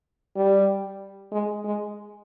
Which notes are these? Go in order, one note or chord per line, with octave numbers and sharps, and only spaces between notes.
G3
G#3
G#3